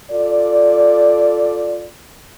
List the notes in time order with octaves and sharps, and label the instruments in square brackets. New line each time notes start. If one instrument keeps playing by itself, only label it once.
[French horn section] F4 A4 D5